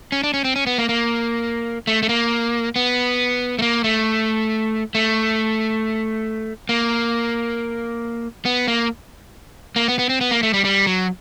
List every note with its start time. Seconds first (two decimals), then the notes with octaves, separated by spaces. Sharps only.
0.12 C#4
0.23 D4
0.34 C#4
0.44 C4
0.56 C#4
0.67 B3
0.78 A#3
0.89 A#3
1.87 A3
2.03 A3
2.09 A#3
2.76 B3
3.59 A3
3.62 A#3
3.84 A3
4.95 A3
6.69 A#3
8.45 B3
8.68 A#3
9.76 A#3
9.88 B3
9.99 B3
10.09 C4
10.21 B3
10.31 A#3
10.43 A3
10.53 G3
10.65 G3
10.86 F#3